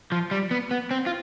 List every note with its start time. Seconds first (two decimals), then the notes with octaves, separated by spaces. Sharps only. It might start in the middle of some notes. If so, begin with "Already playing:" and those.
0.12 F3
0.31 G3
0.51 B3
0.71 B3
0.91 C4
1.06 F4